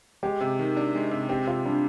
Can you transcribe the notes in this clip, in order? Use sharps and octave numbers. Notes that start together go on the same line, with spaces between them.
G#3 G4
C3
D#3
D4
G#3
C3
C4 G4
C3 F4
G3 D4